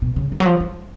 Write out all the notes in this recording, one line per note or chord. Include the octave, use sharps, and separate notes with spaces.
B2
C#3
D#3
F#3
F3
G#3